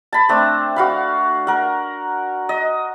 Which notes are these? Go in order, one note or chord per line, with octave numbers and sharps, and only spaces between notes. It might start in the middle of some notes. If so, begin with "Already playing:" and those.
A5 B5
A3 C4 D4
F#4 F5 B5
A#4 F#5
D#5